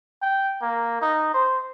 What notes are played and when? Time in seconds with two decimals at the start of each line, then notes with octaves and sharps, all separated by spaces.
0.22 G5
0.62 A#3
1.01 D#4
1.34 C5